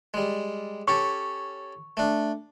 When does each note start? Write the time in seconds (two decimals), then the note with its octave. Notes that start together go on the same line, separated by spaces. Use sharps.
0.14 G3 G#3
0.88 C#4 G4 A4 C#6
1.97 A3 D4